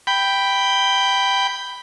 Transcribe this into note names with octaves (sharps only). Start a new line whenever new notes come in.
G5 B5